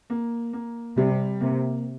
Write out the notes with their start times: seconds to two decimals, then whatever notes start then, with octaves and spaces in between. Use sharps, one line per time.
0.10 A#3
0.53 A#3
0.97 C3 G3
1.41 C3 A#3